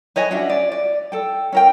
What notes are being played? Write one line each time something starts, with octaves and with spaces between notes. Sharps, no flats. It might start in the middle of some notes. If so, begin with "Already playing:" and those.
B4 C#5 D#5 G#5
C#4 D4 F#4 E5
D5
D5
A4 G5
C#4 A#4 G5